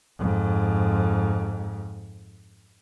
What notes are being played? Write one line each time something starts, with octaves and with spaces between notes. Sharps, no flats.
F2 G#2